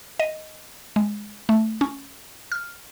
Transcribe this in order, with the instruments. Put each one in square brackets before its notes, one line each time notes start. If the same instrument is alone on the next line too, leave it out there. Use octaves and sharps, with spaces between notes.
[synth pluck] D#5
G#3
A3
C#4
F6